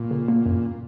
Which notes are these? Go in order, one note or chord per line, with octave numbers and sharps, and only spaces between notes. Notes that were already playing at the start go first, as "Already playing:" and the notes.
Already playing: A#2
C#3
A#3
F#2